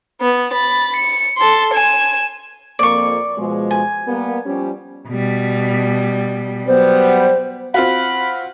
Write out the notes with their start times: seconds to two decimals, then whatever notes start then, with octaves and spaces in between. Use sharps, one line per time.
0.21 B3
0.52 B5 A6
0.96 C#7
1.38 A4 C6
1.73 G#5 E7
2.79 F2 A#3 D5 C#6
3.38 B2 F3 G#3
3.71 G#5
4.07 G3 A#3 B3
4.45 F3 G3 C#4
5.09 B2 G3
6.67 F#3 G3 B3 C5
7.74 C4 F4 F#4 B5